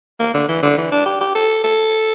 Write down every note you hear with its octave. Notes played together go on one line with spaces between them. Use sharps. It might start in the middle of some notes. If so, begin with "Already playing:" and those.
A#3
D3
E3
D3
E3
D4
G4
G4
A4
A4